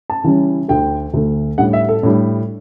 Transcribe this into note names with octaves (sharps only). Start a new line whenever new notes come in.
A5
C#3 E3 G3 C#4
D2 D3 A3 G5
D2 D3 A3
A2 G3 D4 F#5
E5
A4
A2 G3 D4